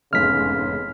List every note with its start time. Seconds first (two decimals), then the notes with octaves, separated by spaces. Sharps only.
0.13 F1 E2 G#2 C#3 F6 B6